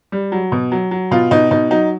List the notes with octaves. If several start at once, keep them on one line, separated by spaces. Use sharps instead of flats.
G3
F#3
B2
F#3
F#3
B2 F4
B2 D#4
B2 D#4
F#3 D#4